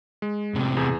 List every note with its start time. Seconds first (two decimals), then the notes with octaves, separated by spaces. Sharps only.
0.22 G#3
0.54 A2 C3
0.77 E2 G#4 G6